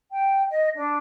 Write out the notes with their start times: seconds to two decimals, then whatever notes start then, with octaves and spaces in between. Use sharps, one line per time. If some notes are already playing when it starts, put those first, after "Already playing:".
0.10 G5
0.51 D#5
0.74 D4